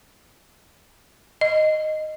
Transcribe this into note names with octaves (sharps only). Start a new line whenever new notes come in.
D#5